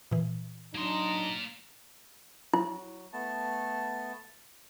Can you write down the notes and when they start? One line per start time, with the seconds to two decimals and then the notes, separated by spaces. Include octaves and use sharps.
0.11 A#2 E3
0.75 F#3 A#3 D4 D#4 C6
2.54 F#3 E4
3.13 A3 B3 A5